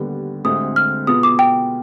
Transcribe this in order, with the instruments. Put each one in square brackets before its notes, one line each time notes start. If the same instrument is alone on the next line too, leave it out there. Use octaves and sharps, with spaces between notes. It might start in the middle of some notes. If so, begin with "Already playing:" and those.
Already playing: [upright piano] D#2 D3 G3 B3
[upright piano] D2 D3 G#3 C4 [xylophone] D#6
[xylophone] F6
[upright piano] B2 B3 F4 G#4 [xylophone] D#6
[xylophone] D6
G5